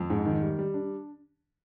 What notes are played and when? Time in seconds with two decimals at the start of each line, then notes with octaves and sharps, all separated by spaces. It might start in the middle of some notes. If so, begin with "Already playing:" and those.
Already playing: F2
0.10 G#2
0.25 D#3
0.42 G3
0.59 G3
0.74 D4